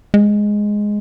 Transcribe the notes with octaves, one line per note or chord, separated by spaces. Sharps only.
G#3